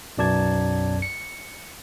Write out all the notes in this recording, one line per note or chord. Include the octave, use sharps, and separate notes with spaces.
B1 F#2 D5 A5 G#6
C#7